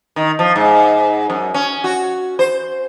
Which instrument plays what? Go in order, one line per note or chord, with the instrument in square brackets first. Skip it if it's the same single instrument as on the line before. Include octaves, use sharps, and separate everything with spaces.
[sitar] D#3
F3
G#2
F#2
C#4
F#4
C5